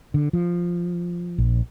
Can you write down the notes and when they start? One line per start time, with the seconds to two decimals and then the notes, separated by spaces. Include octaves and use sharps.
0.14 D3
0.33 F3
1.38 A#1